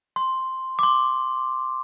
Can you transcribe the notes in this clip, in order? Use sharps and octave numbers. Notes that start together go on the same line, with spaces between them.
C6
D6
C6